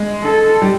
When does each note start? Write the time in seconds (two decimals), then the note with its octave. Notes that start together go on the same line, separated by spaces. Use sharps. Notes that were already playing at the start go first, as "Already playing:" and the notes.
Already playing: G#3
0.22 A4
0.62 G3